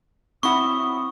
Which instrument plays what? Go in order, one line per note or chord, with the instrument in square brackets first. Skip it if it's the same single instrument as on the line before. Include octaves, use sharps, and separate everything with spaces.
[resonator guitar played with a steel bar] F#3 E4 F#5 [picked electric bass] C4 [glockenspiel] C#6 [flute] D#6